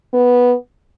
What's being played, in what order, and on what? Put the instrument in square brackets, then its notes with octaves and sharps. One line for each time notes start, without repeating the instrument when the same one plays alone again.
[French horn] B3